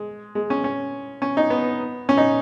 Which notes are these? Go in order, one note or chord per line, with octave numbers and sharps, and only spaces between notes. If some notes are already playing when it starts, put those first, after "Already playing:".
Already playing: G#3
G#3
C#4
C#4
C#4
D#4
B3
C#4
D#4